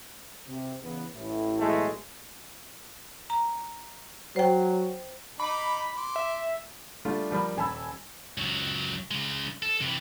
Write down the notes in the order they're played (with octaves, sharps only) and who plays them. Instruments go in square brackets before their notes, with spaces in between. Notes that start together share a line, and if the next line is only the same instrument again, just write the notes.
[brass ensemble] C3
E2 C#3 B3
A1 A2 E4
[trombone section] B1 G#3 A3
[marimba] A#5
[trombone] F#3 [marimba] C5 G5
[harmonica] D#4 D6 [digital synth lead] B5
[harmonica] C6 D6
[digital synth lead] E5
[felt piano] G3 A3 D4 F4
F3 G3 A#4 B5
D#1 G#5 A5 B5 E6 G#6
[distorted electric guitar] C#2 F#3
C#3 G#3
A4
C3 E3